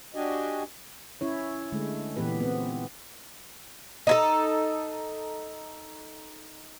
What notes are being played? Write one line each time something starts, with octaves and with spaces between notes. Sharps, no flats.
D4 F#4 G4 D#5 G#5
C#4 E4 C#5
D3 G#3 A3
A#2 E3 B3 G4 B4
B3 C4
D#4 E4 A4